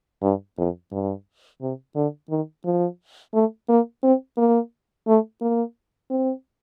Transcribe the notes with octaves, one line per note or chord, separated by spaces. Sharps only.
G2
F2
G2
C3
D3
D#3
F3
A3
A#3
C4
A#3
A3
A#3
C4